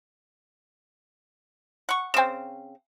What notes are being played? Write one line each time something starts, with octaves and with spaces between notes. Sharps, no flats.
F#5 C#6
C#3 C4 G5 E7